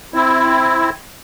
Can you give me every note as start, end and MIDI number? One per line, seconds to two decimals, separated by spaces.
0.14 0.90 60
0.14 0.90 64